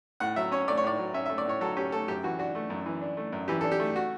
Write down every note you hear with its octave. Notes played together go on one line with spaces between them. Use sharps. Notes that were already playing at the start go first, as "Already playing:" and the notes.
A2 F#5
F#3 E5
C#4 C#5
A3 D5
C#5
A2 D5
F#3
C#4 E5
A3 E5
D5
A2 C#5
F#3 A4
C#4 G4
A3 A4
F#2 G4
E3 F#4
D4 F#4
A3
F#2
E3
D4
A3
F#2
E3 G4
D4 A4
G4
A3
F#4